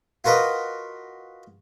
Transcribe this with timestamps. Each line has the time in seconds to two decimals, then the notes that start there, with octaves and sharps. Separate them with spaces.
0.24 F4 F#4 A#4 B4 D#5